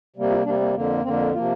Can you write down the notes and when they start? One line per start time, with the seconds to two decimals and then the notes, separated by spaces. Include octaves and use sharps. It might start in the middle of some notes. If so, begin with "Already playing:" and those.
0.16 C3 G3 A#3
0.31 F4
0.45 C3 G3 A#3 D4
0.60 A#3
0.74 F2 D3 A#3
1.04 F2 D3 A#3 C4
1.33 C3 F3 A#3 F4